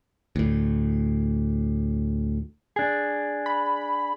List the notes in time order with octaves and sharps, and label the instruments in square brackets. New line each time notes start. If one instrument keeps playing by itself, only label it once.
[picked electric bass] D2 A2
[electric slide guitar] D4 G#4
[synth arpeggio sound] B5